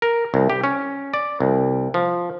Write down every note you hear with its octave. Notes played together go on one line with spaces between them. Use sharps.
A#4
C2
G4
C#4
D5
C2
F3